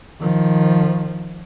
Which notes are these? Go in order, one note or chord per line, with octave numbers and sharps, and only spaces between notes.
D#3 F3